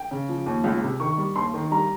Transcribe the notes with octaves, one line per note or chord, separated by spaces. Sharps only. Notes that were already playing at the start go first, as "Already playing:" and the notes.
Already playing: G5
C#3
F3
D#2
C#2
C3
D#3 C#6
G3
D#2 C6
D#3
G3 A#5